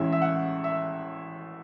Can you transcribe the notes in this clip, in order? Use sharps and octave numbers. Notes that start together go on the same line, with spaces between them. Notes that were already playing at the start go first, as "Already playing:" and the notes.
Already playing: A1 A2 G#3 C#4 E5
E5
F#5
E5